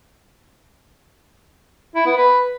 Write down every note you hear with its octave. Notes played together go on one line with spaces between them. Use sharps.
E4
B3
B4